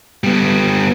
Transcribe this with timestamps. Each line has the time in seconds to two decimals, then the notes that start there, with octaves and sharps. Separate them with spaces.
0.24 G3 B3